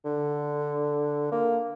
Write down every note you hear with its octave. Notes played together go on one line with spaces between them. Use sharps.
D3
A#3